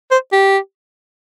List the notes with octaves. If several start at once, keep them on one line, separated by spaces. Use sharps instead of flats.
C5
G4